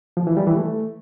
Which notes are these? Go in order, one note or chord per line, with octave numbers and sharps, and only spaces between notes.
F3
E3
G3
E3
A3